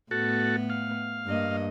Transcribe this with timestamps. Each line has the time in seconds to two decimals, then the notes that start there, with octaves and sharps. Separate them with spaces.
0.11 A2 B3 F#4 A4
0.70 F5
1.26 G2 A#3 D#5